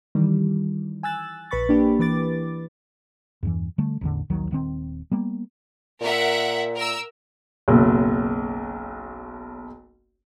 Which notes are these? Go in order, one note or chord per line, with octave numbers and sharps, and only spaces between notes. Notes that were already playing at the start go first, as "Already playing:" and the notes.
D#3 E3 G3
G#5 E6 F#6 A6
A#1 B4 B5 C#6 A6
A#3 D4 G4
E3 B4 D6 A6
E2 G2 E3
D3 G3 A3
A1 E2 D3
A#1 D#2 D#3 F#3
D#1 D#3 C4
G3 A#3 B3
A#2 A#4 E5 F#5
A#4 E6
F#1 B1